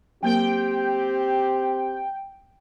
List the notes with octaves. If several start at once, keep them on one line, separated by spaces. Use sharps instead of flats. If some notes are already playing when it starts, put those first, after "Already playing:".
F#3 A#3 C4 G4 A#4 G5